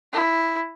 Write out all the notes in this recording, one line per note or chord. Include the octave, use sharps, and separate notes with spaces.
E4